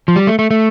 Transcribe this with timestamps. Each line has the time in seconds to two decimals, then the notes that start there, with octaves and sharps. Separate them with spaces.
0.08 F3
0.16 G3
0.27 A3
0.39 A3
0.51 A3